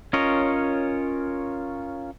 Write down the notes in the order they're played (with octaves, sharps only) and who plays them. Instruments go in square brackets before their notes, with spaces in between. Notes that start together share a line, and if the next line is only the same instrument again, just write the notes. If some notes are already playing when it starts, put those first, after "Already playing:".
[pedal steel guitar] C#4 F4 A#4 C#5 D#5